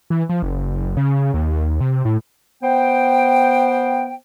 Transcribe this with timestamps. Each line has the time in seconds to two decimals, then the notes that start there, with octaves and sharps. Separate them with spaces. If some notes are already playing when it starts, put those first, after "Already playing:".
0.10 E3
0.29 F3
0.42 F#1
0.97 C#3
1.34 D#2
1.80 C3
2.05 A2
2.62 B3 C5 G5